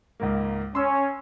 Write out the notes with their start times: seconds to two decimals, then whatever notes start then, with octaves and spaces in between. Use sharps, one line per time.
0.20 C#2 G#2 A#3
0.75 C#4 C6 E6